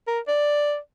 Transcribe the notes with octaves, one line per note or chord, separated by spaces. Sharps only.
A#4
D5